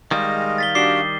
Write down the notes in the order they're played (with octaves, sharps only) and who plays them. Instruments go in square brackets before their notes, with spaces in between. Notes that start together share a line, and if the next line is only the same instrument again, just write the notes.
[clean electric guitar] D#3 G3 [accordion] G#3 D#5 [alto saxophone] F5 [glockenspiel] D#6
[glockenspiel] A6 B6 G7
[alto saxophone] D4 [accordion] F#4 G4 F5 [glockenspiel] D6 C7 G7